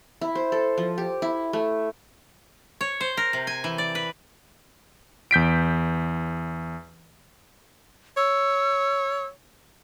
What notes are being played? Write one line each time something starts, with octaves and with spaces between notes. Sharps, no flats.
E4
C5
A4
F3
G4
E4
A3
C#5
C5
A#4
C3
G#5
E3
D5
B4
E2 G6 B6 D7
C#5 E6